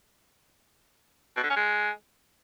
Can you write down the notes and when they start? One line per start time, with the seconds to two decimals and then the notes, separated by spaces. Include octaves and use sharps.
1.37 B2
1.43 D3
1.50 C#4
1.56 G#3